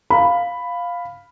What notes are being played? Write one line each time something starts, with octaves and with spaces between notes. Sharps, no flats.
F5 B5